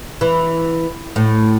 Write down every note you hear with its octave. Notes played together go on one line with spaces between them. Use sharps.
E3
A2